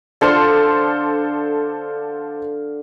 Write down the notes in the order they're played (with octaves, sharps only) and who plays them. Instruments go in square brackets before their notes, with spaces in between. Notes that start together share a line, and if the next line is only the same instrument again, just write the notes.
[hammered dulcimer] D3 F5 C6 [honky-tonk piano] D4 A4 C5